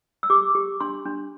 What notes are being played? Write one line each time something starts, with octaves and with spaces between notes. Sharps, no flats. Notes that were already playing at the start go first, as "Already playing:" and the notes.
E6
G4 D6
G4
D4 C6
D4